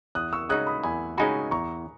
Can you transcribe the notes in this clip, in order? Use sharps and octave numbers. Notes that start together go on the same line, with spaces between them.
E2 D#6 F#6
C#6 E6
C#3 G#3 D#4 F#4 D#6 F#6
B5 D#6
E2 G#5 B5
C#3 G#3 D#4 F#4 G#5 B5
E2 A#5 C#6